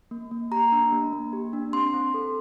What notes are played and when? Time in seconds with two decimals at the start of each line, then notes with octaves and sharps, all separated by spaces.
0.11 A#3
0.31 A#3
0.52 G4 A#5
0.72 D4
0.92 A#3
1.13 A#3
1.33 G4
1.53 D4
1.73 C4 C6
1.94 C4
2.14 A4